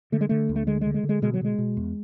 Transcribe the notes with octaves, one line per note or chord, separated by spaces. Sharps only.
D3 A3
G#3
D3 A3
D2
A3
D3 G#3
G#3
D3
G#3
D3
G#3
B2 G#3
F#3
B2 G#3
B2
E2